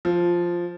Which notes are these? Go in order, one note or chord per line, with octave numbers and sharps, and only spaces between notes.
F3